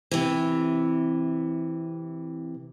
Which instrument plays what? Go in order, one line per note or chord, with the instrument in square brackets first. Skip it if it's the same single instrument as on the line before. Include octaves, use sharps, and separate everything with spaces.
[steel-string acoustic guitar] C3 E3